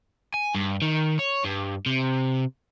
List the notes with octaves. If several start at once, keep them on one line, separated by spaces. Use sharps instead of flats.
G#5
G2
D#3
C#5
G2
C3